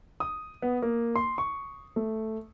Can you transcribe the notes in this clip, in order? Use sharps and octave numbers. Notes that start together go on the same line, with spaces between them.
D#6
B3
A#3
C6
C#6
A3